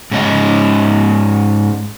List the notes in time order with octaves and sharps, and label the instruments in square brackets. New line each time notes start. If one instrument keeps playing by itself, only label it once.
[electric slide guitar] G#2 C#4 D#5